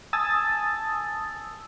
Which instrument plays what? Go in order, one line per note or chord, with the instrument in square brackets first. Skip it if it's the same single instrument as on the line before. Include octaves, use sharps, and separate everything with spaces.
[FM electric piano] G#5 A5 D#6 E6 A6